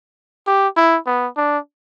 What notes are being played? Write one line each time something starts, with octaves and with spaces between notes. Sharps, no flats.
G4
E4
B3
D4